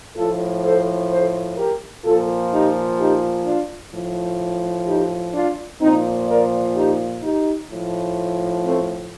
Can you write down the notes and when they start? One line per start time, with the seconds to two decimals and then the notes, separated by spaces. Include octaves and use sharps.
0.16 A2 F3 F4 A4
0.64 A4 C5
1.10 A4 C5
1.58 G4 A#4
2.05 A#2 F3 F4 A4
2.52 D#4 G4
2.99 D#4 G4
3.46 D4 F4
3.93 A2 F3
4.87 D#4 G4
5.34 D4 F4
5.81 A#2 F3 C4 D#4
6.28 A#4 D5
6.75 D#4 G4
7.22 D#4 G4
7.69 A2 F3
8.64 A3 C4